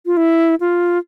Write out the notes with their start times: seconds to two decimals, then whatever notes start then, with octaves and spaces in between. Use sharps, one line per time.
0.06 F4
0.17 E4
0.60 F4